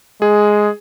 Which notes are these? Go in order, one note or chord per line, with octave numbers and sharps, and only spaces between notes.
G#3 G#4